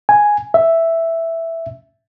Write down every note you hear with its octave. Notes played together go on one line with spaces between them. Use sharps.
G#5
E5